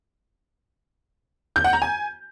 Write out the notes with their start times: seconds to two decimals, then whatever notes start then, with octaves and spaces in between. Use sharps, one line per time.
1.56 G6
1.64 F#5
1.73 A#5
1.82 G#5